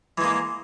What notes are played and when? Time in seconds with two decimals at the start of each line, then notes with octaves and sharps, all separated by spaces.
0.18 E3
0.21 G#3
0.24 A#3